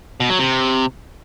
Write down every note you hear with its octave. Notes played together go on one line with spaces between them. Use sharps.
B2
F#3
C3